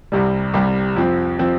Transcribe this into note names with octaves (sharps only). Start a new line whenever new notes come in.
C2 C3 G3
C2 C3 G3
F2 F3 C4
F3 C4